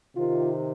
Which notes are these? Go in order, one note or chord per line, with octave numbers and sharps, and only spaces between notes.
C3 D#3 F4